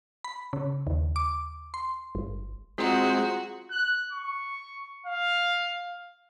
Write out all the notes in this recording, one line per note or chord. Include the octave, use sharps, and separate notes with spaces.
B5
C#3
D#2
D6
C6
G1
G#3 C4 F4 F#4 G#4 A#5
F#6
C#6
F5